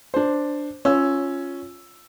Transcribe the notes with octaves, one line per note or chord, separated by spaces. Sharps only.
D4 C5
C#4 F4 E6